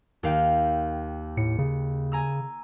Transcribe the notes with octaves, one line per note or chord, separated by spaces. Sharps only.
D#2 F5 G5
A2 C#7
C#3
G#5 A#5 E6